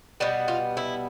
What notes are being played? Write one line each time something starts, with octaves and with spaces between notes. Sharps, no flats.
B2 G3 B3 G4
F4
E4